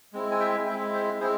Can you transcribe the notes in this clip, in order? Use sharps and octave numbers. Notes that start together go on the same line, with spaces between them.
G#3 C4 E4
G#5
E5 G5
G#3 C4 E4 E5 G5
C5 E5
G#3 C4 E4 G#4 C5